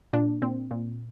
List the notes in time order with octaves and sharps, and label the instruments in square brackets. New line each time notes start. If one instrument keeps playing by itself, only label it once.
[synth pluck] A#2 D4
A#2 C4
A#2